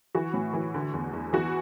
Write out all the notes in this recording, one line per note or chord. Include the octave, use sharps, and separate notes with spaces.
E3 F#4
A2
E3
D3
E2
E2
E3 F#4